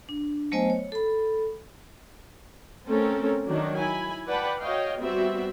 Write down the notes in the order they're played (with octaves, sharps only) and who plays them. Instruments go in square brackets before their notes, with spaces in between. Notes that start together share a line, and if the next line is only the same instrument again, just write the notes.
[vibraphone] D4
F#3 A3 B3 C5 D#5 G#5
C#5
A4 B5
[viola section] A3 C4 C#4 A4 A#4
D#3 F#3 D4
E4 G#5 B5
B4 D5 F#5 G5 A5 B5
F#4 C#5 D#5 F5 G5
G3 B3 C4 F#4 E5